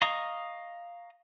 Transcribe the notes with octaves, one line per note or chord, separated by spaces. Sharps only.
D#5 F5 A#5 C#6 D#6